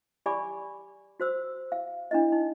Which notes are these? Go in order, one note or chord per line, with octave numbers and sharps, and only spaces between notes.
G4 D5 G#5 B5 C#6 D6
F#4 C5 E6
F5
D4 E4 D#5
D#4